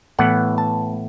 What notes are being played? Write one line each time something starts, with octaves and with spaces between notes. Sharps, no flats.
A2 E3 B3 F#5
A5